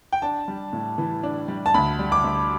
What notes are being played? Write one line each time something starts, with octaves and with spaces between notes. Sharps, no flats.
G5
D4 A5
G3
A2
E3
D4
G3
A5
D2 B5
G3
D6
D2